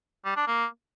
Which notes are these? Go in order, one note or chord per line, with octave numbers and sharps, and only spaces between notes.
G3
D4
A#3